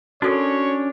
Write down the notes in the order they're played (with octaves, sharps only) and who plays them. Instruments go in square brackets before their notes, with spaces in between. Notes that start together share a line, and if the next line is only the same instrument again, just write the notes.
[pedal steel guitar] C#4 D4 [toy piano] F#4 A4 A#4 [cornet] C#5